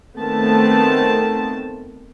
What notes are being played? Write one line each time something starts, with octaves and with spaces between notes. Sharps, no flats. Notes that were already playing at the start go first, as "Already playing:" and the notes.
D#3 A3 B3 C4 A5